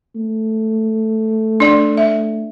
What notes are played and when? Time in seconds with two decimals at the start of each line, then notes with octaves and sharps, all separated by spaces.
0.16 A3
1.60 D4 D5
1.97 E5